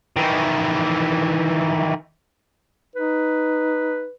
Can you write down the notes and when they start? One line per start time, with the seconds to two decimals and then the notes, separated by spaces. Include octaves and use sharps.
0.17 D#3 E3
2.95 D#4 B4